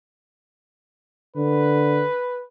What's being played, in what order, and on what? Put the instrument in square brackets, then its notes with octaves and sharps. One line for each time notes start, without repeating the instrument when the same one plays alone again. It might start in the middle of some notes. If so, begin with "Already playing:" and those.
[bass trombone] D3 [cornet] B4